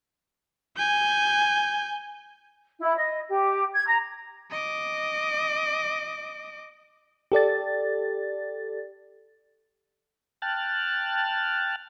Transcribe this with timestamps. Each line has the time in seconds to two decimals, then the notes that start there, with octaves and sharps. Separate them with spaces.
0.76 G#5 G6
2.81 E4
2.97 D#5
3.30 G4
3.73 G#6
3.86 A#5
4.51 D#5 D6
7.32 G4 A4 D5 A6
10.42 G5 A5 F6 F#6 A6